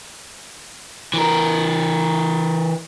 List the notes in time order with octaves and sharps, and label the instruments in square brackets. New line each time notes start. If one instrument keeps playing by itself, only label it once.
[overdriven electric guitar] E3 A#4